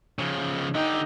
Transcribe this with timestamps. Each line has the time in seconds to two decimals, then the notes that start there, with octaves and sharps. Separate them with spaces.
0.19 C#3 F3
0.75 D3 D#4 G4